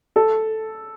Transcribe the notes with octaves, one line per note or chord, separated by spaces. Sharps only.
A4